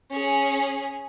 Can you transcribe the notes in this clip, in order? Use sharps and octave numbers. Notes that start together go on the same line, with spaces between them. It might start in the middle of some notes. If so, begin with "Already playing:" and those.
C#4 G#4